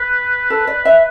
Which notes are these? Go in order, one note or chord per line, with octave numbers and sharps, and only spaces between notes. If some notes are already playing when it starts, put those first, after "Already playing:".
Already playing: B4
A4
D5
E5